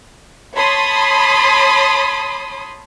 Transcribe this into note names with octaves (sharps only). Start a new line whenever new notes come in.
C#5 A5 B5 C6 D#6